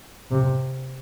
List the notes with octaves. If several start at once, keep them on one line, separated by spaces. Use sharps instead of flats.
C3